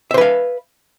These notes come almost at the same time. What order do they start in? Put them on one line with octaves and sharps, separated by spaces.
E5 C5 B4 F5